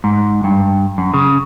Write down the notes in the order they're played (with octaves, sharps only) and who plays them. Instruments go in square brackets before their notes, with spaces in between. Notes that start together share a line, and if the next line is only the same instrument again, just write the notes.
[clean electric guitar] G#2
G2
F#2
C#3